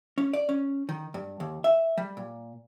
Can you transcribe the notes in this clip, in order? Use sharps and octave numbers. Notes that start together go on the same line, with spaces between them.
C#4
D5
C#4
D#3
G2
D#2
E5
G3
A#2